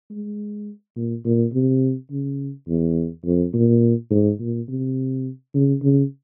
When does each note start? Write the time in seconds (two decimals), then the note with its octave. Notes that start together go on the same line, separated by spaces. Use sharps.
0.10 G#3
0.96 A#2
1.25 A#2
1.53 C3
2.11 C#3
2.68 E2
3.25 F2
3.54 A#2
4.11 G#2
4.40 A#2
4.69 C3
5.54 C#3
5.83 C#3